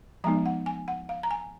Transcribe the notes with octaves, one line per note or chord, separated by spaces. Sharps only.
F3 G#3 B3 D#4 A#5
F#5
G#5
F#5
F5
A#5
G#5